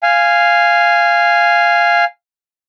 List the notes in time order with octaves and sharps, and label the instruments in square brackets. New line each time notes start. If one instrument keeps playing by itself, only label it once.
[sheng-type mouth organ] F5 G#5